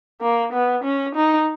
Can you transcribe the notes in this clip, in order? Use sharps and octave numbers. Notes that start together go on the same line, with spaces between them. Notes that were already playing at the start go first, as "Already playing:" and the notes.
A#3
B3
C#4
D#4